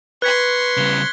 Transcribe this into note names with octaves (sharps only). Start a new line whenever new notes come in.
B4 C6 C#6 F#6 G#6 B6
C#3 G3 G7